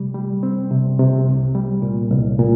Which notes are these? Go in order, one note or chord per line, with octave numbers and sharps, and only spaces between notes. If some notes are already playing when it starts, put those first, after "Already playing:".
Already playing: C3 G3
G3
C4
C3
C3
C2
G3
A#2
C2
A#2